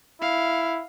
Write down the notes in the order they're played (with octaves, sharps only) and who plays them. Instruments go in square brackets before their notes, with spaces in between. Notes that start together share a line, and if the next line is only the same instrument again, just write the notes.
[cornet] E4 [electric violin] F5